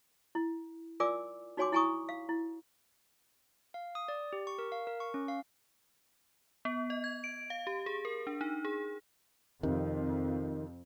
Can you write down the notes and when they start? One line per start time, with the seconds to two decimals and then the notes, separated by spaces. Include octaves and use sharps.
0.35 E4
1.00 F4 A#4 D5 G#5 D6 E6
1.57 D#4 F#4 C#5 G#5 C6 D6
1.72 E4 F#5 G#5 A#5 C#6 D#6
2.09 F5
2.29 E4
3.74 F5
3.95 D#6
4.08 D5
4.33 G4
4.47 C#6
4.59 A#4
4.72 F5
4.87 A#4
5.00 C#6
5.14 C#4
5.28 F5
6.65 B3
6.90 D#5
7.04 G#6
7.24 D7
7.50 F5
7.67 G4
7.86 G#4
8.05 A#4
8.27 D4
8.41 D#4
8.65 G#4
9.63 F2 C3 D#3